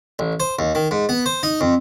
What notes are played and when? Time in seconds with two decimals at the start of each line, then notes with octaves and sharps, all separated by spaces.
0.19 A1
0.40 C5
0.59 D#2
0.75 D#3
0.91 G#2
1.09 B3
1.26 C5
1.43 D#4
1.61 F2